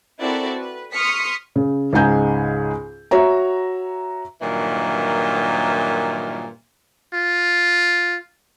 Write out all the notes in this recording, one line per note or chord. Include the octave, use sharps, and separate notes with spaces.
C4 E4 F#4 A4 A#4 D5
B4
C6 C#6 D#6 F6 B6 C#7
C#3
C#2 G#2 D#4 G#5 G6
F#4 C#5 E5 A#5
G2 A#2 D#3 E3 F#3
F4